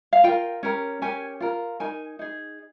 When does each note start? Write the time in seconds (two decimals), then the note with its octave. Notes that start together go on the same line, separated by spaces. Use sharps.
0.13 F5
0.24 F4 A#4 G5
0.63 C#4 G4 A#4
1.02 C#4 G4 A#4 G#5
1.40 F4 A#4
1.80 D#4 A#4 G#5
2.19 D#4 G#4